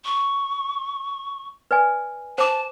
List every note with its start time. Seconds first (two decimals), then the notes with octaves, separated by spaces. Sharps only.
0.05 C#6
1.71 B4 D5 G#5
2.38 C5 A5 D6